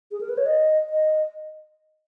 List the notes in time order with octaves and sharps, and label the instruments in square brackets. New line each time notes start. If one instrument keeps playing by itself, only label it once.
[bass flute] G#4
A#4
B4
C#5
D#5
D#5